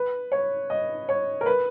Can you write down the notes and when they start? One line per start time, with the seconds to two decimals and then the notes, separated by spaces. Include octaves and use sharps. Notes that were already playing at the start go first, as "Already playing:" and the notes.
Already playing: B4
0.32 C#5
0.70 D#5
1.09 C#5
1.41 A#4
1.46 B4